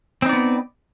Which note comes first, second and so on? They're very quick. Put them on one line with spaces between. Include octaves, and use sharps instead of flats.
C4 D#4 D5 B3